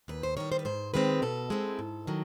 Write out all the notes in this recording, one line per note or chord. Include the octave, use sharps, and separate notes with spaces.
D#2 B4
C5
D#3 G3 C#5
C5
B4
G#2 C5
D#3 G#3 C4 B4
B2 A4
G#3 C4 E4
G#2
D#3 F#3